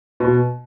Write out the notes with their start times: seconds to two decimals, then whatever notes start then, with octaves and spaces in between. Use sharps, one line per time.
0.20 B2